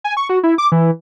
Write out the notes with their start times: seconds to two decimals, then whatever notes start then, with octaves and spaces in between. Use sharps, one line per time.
0.04 G#5
0.17 C#6
0.29 F#4
0.43 E4
0.58 D6
0.72 E3